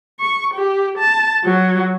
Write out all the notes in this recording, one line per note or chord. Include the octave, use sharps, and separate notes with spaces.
C#6
G4
A5
F#3